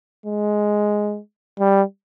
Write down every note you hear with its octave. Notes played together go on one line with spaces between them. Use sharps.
G#3
G3